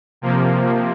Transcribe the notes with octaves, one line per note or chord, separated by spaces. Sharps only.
C3 F3 A#3